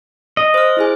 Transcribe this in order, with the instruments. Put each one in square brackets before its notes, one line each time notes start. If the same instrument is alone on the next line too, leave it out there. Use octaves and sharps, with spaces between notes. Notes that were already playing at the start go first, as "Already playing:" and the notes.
[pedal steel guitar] D#5
[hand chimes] C5 F6
E4 G#4 G#5